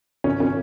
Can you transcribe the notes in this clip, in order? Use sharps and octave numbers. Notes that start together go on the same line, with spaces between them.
G#1 F#2 C#3 F3 B3 C#4
C#4